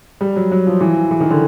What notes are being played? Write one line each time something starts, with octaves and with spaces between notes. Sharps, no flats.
G3
F#3
F#3
F3
E3
E3
D#3
D3